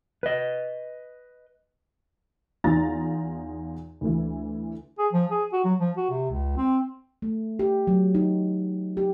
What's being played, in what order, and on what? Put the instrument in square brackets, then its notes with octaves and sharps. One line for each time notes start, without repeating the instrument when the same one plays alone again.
[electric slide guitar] B4 D#5
[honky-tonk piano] E2 D#4 F4 A#5 A6
D2 E3
[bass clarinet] G#4
F3
G#4
F#4
F#3
F3
F#4
C3
C#2
C4
[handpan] A3
G4
F#3
D#4
G4